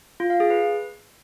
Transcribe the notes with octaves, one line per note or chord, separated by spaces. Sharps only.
F4
F5
G#4
B4